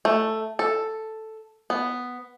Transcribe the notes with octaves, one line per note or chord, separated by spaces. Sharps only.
A3
A4
B3